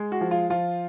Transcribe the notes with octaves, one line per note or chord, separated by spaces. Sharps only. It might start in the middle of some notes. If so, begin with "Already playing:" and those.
Already playing: G#3
F#4
F3
F4
F3 F4